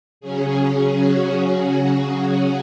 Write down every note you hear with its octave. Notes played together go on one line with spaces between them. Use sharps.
C#3 F#3 C#4 G#4
F#4
G#4
F#4
F#4